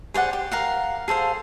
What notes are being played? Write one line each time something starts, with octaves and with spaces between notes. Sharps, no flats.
G#4 C5 D5 F#5
G4
A#4 F5 F#5
G#4 A4 C5 F5